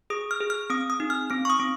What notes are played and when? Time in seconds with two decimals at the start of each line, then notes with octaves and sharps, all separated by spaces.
0.10 G#4 D#6
0.31 F6
0.41 G#4
0.50 F6
0.70 C4 D#6
0.90 D#6
1.00 D#4
1.10 F6
1.30 C4 F6
1.45 C#6
1.50 D#6
1.60 C4